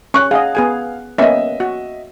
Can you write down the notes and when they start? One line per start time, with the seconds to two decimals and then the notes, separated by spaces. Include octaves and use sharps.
0.14 C#4 C#6 F#6
0.31 G#4 D#5 F5 F#5
0.55 B3 G#4 G#5
1.18 A#3 B3 C#4 D#5 E5
1.60 F#4